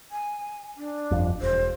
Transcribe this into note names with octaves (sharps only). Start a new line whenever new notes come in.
G#5
D4
G1 F2
E1 C5